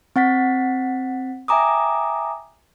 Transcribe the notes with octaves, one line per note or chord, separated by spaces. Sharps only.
C4 F#5 A6 B6
E5 G5 G#5 A#5 D6 D#6